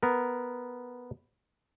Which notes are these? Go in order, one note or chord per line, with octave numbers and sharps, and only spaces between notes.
B3 A#4